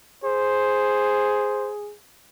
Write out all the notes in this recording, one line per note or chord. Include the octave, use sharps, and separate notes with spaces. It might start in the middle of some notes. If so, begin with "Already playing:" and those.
G#4 C5